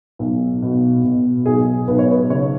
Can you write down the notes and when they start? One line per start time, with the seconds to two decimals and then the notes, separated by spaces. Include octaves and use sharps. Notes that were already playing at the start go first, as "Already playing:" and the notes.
0.19 B1
0.62 B2
1.04 B2
1.46 B1 G#4
1.88 B1 B4
1.99 C#5
2.11 B4
2.30 C#3 C#5